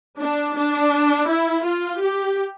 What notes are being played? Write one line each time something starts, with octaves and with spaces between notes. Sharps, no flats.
D4
D4
E4
F4
G4